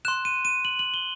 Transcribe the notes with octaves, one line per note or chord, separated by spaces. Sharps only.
C6 F#6 E7
D#7
D#7
F#7
F#7
G7